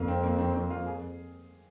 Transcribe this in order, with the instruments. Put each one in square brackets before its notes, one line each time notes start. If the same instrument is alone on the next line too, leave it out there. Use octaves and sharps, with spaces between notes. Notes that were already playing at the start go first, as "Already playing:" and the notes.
Already playing: [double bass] F2 [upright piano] A#3 F4
[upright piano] C4
A#3
C4
C4
F4
G#4